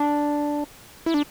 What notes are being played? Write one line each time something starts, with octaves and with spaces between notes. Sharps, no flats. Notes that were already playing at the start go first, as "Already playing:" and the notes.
Already playing: D4
E4
D4